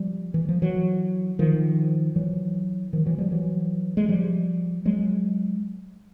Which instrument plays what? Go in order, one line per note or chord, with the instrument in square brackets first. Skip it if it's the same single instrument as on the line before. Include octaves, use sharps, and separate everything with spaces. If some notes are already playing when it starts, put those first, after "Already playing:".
Already playing: [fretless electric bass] F3 G3
E3
F3
E3 F#3
D#3 F3
E3 F#3
D#3 F3
E3 F#3
F3 G3
E3 F#3
G#3
F3 G3
F#3 G#3